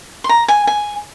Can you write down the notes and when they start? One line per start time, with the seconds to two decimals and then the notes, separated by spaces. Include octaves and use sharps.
0.24 C6
0.29 A#5
0.48 G#5
0.67 G#5